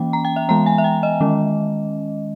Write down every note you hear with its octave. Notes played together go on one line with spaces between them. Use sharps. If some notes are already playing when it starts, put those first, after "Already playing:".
Already playing: E3 A#3 C#4 G5
A#5
G5
E5
E3 G#3 B3 A#5
G#5
E5
G5
D#5
D#3 G#3 C#4